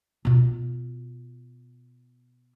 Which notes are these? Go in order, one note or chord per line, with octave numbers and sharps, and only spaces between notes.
B2 F4